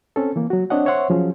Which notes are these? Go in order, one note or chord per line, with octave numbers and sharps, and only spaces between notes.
C4 C#4 A4
E3 A#3
F#3 F#4
C4 D4 C#5 D#5 F#5
C5 C#5 E5 F#5 C6 C#6
F3 F#3 C#4 G#4